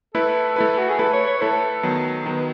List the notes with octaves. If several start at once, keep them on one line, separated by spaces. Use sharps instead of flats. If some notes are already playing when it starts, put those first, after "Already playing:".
A3 E4 A4 B4
A3 E4 B4
F#4
G#4
A3 E4 A4 B4
C#5
C#5
A3 E4 A4 B4
D#3 F#3 B3
D#3 F#3 B3 B4